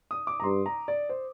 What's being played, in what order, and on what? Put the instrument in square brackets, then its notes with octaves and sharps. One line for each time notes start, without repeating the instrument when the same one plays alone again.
[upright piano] D#6
D6
A#5
[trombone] G2 [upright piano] C6
[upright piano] A#5
D5
C5